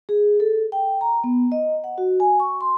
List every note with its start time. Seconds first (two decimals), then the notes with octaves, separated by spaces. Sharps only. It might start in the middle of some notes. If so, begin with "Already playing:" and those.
0.09 G#4
0.40 A4
0.72 G5
1.01 A#5
1.24 B3
1.52 D#5
1.84 F#5
1.98 F#4
2.20 G#5
2.40 C#6
2.61 C6